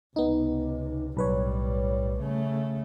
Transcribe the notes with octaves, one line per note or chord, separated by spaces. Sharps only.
C#2 C3 B3 D#4
B1 A2 G3 B4 C#5
C#3 A3